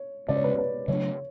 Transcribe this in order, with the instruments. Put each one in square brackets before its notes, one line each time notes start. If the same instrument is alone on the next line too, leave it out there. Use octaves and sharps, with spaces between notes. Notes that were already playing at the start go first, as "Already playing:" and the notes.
Already playing: [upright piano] C#5
[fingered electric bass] C#3 G#3 C#4 [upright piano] D5
[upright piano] C#5
B4
C#5
B4
[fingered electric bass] C#3 F#3 A3 D4 [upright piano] C#5